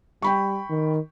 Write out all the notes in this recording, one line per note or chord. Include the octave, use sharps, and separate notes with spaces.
G3 G5 B5 C#6
D#3